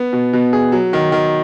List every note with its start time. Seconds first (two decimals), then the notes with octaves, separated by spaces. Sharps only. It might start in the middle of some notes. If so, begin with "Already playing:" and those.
Already playing: B3
0.13 B2
0.33 B2
0.53 G#4
0.72 F#3
0.93 D#3
1.12 D#3